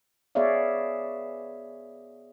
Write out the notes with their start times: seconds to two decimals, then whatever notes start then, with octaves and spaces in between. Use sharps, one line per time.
0.35 B3 G#4 C#5 D5 E5 F5